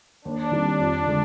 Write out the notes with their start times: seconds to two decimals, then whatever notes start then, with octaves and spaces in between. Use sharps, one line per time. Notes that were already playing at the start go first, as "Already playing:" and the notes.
0.25 D#2 D4
0.52 D#3 G3 C4
0.80 F2
1.07 D3 G#3